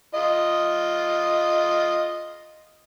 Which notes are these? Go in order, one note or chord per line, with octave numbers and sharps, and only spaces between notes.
F4 D#5